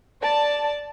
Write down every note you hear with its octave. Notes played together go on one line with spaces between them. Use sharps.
D5 A5